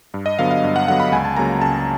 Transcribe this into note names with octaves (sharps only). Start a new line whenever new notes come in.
G2
D#5
D3 F#3 B3 F5
F5
G2
F#5
D3 F#3 B3 F#5
B5
C#2 G#5
A5
C#3 F#3 A#3 A#5
C#2 A5